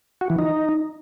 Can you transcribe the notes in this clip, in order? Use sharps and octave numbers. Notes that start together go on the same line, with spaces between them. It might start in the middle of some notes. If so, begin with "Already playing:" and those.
F#4
E3
D#4